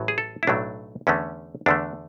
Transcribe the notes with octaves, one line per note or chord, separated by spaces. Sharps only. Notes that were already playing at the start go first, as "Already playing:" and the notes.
Already playing: A1 A2 F#3
G#4
A4
E4
B1 A2 F#3 A3 D4
E2 D3 A3 C#4
E2 D3 A3 D4